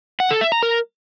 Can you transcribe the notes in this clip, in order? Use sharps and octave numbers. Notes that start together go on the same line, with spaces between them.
F#5
A4
E5
A#5
A#4